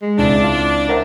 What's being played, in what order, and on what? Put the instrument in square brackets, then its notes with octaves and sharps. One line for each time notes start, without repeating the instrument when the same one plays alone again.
[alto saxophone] G#3
[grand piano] C#2 C4 E4 [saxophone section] D4
[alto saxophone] F4
[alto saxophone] A#4 [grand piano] C5 E5 F#5